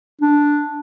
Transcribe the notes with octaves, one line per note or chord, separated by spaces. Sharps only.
D4